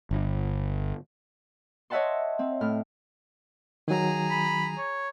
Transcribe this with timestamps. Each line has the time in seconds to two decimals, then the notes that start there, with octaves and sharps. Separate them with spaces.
0.11 G1
1.90 C#5 D#5 E5 F#5 A5 C6
2.39 C4
2.61 A2 F6
3.88 D#3 F#3 G#4 A#5
4.30 B5
4.78 C#5